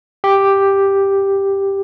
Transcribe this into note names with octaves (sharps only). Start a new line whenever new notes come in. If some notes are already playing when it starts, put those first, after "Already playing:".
G4